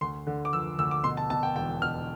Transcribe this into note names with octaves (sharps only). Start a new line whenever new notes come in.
D2 C6
D3
D6
F3 E6
D2 E6
D6
B2 C6
A5
B2 A5
G5
E1 G5
B2 F6